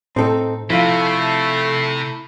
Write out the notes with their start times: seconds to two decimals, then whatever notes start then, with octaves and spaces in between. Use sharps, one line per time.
0.16 A2 C4 D#4 A4
0.70 C3 F3 A3 E4 F4